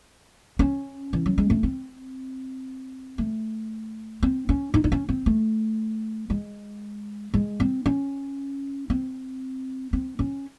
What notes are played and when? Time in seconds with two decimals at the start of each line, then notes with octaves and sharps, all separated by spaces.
0.59 C#4
1.13 E3
1.26 F#3
1.38 G#3
1.50 A3
1.63 C4
3.18 A3
4.23 C4
4.49 C#4
4.74 D#4
4.84 D#4
4.92 C#4
5.09 C4
5.26 A3
6.30 G#3
7.34 G#3
7.60 C4
7.86 C#4
8.90 C4
9.93 C4
10.19 C#4